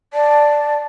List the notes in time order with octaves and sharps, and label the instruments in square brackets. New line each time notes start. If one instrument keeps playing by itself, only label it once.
[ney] D5 [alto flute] A5